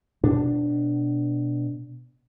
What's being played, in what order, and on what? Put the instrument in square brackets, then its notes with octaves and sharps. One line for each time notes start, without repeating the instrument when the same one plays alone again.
[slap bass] B2 D4